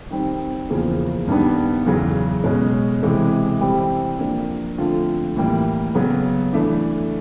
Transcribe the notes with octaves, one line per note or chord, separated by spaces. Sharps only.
D#3 G3 C4
E2 C#3 F3 A#3
G2 D#3 G3 B3 D4
E2 C#3 F#3
B2 G#3 C#4
C3 E3 G#3
E3 G3 C4 E4 G4
F3 A#3 D4
D3 F3 A3 C4 F4
A2 E3 G3 A#3
C#3 F#3 B3
E3 A3 D4